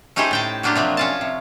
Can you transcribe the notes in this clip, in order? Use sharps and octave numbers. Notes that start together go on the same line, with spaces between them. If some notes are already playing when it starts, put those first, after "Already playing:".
A3 C#4 D#4 G4 G#4 C5
A2 G5 A5
F#3 A#3 D4 F4 G4
C3 F3 F#3
C#4 F4 A5
C3